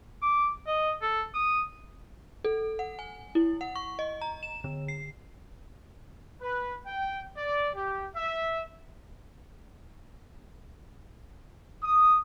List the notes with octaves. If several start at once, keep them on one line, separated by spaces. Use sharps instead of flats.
D6
D#5
A4
D#6
A4
F#5
G#5
E4
F#5
C#6
D#5
A#5
E7
D3
C7
B4
G5
D5
G4
E5
D#6